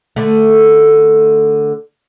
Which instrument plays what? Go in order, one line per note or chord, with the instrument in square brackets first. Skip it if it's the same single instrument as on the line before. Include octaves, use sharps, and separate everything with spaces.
[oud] D3 A3